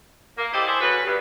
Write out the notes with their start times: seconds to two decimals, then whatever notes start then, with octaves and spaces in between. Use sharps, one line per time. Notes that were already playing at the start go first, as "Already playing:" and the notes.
0.37 A#3
0.53 E4 G4 A4 C5 D5 D#5
0.67 E4 G#4 A4 C5
0.80 D2 C#3 F#4 B4
1.05 G2